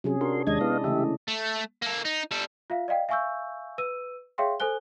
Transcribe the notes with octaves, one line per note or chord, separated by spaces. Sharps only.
C3 F#3 C#4 G#4
D4 F#4 A#4 C6
D#2 G#3 D4 D#5 G#6
B3 E4 D#5 F5
C#3 E3 A3 G4 E5
A3
A#3 A4
D#4
G3 A4
F4 E5 F5
D5 D#5 F5 G5
E5 F5 G#5 C#6 E6 G6
B4 E6 D#7
G#4 C#5 E5 F5 G5 C6
A4 C5 G#5 F#6 G7